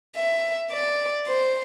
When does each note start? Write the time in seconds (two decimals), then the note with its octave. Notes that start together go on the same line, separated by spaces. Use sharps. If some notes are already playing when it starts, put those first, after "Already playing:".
0.16 E5
0.72 D5
1.27 C5